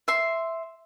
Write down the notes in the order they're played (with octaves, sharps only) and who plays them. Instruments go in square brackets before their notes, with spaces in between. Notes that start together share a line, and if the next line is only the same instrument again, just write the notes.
[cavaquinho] E5 C6